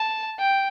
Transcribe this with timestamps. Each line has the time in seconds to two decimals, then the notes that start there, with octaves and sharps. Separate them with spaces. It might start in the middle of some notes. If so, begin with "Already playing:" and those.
Already playing: A5
0.40 G5